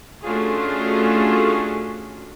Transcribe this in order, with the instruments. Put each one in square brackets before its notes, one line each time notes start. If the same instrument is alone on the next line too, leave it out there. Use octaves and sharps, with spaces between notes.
[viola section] A3 C#4 D4 F4 F#4 G#4